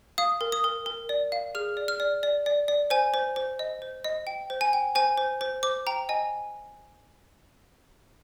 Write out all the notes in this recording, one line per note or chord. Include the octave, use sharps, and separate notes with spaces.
F5 D#6
A#4
D#6
A#4
A#4
D5
F5
G#4 F6
D5
F6
D5
D5
D5
D5
C5 G#5
C5
C5
D#5
C5
D#5
G5
C5
G#5
G5
C5 G#5
C5
C5
C5 D6
G5 A#5
D#5 G#5